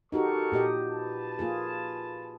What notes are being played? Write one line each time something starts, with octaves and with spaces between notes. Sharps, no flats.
D#4 F#4 G4 A4 A#4 C#6
A#2 G4 D#5
B4 A5
A#3 F4 G#4